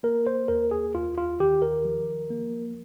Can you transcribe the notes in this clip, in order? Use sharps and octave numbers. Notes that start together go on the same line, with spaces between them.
A#3 A#4
C5
D#2 A#4
G#4
D#2 F4
F4
D#3 G4
A#4
F3
A#3